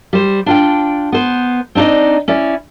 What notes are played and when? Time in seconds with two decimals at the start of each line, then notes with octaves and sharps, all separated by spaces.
0.13 G3 C5
0.46 D4 F4 G5
1.12 B3 C5
1.75 C4 D4 D#4 D5 D#5
2.28 C#4 E4 D5